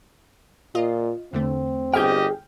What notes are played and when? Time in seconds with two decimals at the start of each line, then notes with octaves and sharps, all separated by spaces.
0.75 A#2 F4 D#5
1.33 E2 D3 A3 C4
1.94 G1 G4 G#4 D#5 G5 F6 G6